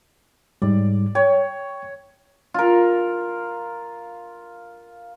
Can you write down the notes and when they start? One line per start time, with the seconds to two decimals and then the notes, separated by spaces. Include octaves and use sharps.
0.62 G#2 G3 D5
1.15 C#5 G5
2.54 F4 A#4